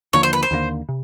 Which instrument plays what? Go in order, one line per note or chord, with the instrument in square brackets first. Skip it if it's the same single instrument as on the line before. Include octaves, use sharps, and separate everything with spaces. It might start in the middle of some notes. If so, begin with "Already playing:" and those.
[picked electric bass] D#2 D3 F3 A#3 [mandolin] C#5
[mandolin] C5
B4
C5
[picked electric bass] D#2 D3 F3 A#3
C3